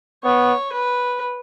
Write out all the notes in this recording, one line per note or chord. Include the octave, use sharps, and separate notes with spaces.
B3 C#5
B4